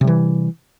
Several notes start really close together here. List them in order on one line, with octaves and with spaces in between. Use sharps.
C3 G3 E3